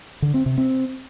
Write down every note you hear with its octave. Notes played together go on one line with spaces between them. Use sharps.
D3
C4
C3
C4